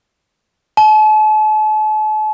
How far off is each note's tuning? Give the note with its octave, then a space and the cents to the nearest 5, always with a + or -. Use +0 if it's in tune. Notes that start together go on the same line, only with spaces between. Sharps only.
A5 -40